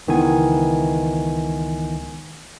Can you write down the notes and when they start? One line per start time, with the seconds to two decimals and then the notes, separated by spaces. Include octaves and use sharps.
0.07 C#2 D#3 E3 B3 G#5